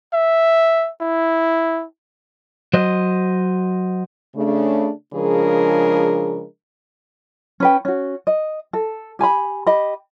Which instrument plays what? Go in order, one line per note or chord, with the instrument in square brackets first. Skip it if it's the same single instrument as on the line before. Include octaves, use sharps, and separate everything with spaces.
[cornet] E5
E4
[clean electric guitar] F#3 C5 D#5
[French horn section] C#3 A3 D4
C#3 F3 G#3 D4 G#4 A#4
[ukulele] C#4 B4 G5
C#4 F#4
D#5
A4
G4 G#5 A#5 B5
G4 D#5 B5